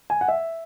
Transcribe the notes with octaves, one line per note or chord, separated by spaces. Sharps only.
G#5
F#5
E5